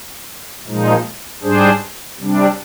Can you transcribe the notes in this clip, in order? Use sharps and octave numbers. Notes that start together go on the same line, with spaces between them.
A#2 F3 G#3 D#4
G#2 G3 D4 G#4 C5
C3 G3 D4